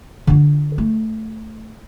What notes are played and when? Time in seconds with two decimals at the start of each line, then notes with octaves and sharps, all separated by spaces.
0.27 D3 F4
0.78 A3